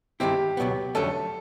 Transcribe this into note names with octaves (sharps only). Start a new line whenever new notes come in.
G2 D#3 G#3 C4 E4 G4
C#2 B2 F#3 B3
F2 D3 F#3 A3 C#4 A4